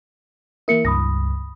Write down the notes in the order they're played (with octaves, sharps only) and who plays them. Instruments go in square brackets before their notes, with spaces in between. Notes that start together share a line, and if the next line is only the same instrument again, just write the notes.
[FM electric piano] E3 A#3 E4 [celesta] A#4 C#7
[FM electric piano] C#2 G2 [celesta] B5 D#6 A#6